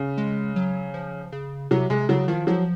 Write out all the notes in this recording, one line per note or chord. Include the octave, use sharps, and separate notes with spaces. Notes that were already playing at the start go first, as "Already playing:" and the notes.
Already playing: C#3
G#3
F#3
F3
C#3
C3 F#3
C3 G#3
C#3 F#3
D#3 F3
F3 F#3